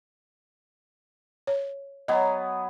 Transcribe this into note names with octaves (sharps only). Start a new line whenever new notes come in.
C#5
F#3 B3 D#5 G#5